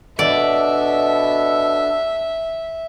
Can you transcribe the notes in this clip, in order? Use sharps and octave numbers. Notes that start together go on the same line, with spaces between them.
B2 D4 A4 D5 E5